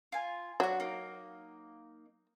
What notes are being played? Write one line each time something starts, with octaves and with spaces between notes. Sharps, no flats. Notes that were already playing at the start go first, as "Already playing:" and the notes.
F4 G#5
F#3 D4 F#4
A#3 D#4